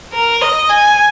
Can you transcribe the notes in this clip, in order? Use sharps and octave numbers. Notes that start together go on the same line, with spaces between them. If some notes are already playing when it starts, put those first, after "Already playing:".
A#4
D#5
G#5